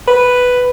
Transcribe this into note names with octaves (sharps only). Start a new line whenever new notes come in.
B4